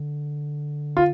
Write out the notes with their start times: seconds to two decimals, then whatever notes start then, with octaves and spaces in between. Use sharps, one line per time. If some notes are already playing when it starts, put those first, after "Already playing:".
Already playing: D3
0.97 F4